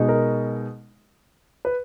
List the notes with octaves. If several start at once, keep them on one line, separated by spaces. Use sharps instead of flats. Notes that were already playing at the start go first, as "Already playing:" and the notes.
Already playing: B2 G#3 D#4
A#4
B4